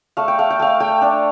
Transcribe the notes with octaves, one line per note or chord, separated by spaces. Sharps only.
A3 F5
G5
A3 F5
G5
A3 F5
A3 G5
D4